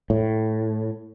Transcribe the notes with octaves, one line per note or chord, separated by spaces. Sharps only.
A2